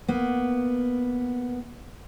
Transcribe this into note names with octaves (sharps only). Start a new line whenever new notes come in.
A#3 B3